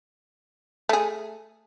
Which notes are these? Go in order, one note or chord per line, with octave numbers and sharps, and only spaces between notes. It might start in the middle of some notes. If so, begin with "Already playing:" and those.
A3 G#4